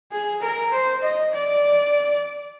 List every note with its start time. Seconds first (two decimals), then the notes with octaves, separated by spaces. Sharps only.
0.12 G#4
0.42 A#4
0.72 C5
1.03 D#5
1.33 D5